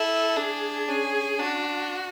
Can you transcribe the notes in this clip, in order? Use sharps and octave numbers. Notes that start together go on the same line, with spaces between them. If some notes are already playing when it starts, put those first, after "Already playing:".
Already playing: E4 A4
D4 G#4
C#4 G#4
D4 F#4